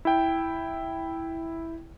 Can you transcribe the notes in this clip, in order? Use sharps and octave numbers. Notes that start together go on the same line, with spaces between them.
E4 G5